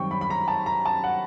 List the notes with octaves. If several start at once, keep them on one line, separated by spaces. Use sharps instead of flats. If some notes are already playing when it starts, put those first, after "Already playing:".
Already playing: F#2 D#3 G3 C4 G5 C#6
B5
B5
A#5
A5
A#5
A5
F#5